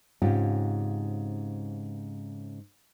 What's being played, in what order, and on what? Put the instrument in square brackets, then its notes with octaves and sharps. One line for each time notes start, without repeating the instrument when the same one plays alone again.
[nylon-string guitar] G#2 C#3 C4 C#4 F4 G4